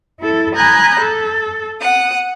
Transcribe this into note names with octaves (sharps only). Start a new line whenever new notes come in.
E4 A4
G#5 A#5 B5 D#6 F#6 G6
A4
F#5 D#6